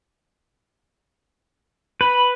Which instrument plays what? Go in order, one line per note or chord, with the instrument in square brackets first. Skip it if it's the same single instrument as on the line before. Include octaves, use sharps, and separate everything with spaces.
[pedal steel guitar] B4 [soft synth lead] B5